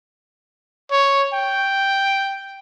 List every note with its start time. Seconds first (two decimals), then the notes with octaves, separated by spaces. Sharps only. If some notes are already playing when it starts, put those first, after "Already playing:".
0.91 C#5
1.33 G5